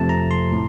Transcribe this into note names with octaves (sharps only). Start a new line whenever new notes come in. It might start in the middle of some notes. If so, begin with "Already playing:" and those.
Already playing: F2 C3 F3 A3 A5
A#5
C6
A2